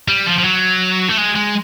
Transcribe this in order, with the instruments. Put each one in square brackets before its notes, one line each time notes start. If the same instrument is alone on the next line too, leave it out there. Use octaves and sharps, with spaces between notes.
[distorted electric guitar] G3
F3
F3
F#3
A3
G#3
G#3